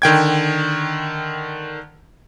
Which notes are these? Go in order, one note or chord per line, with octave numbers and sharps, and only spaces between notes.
D3 D#3 G5 G#6